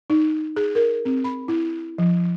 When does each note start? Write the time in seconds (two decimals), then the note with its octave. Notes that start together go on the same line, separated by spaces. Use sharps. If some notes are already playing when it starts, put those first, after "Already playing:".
0.10 D#4
0.56 G#4
0.75 A#4
1.05 C4
1.24 B5
1.48 E4
1.98 F3